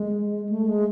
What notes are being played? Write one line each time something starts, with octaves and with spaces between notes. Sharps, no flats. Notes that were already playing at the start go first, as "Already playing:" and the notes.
Already playing: G#3
A3
G#3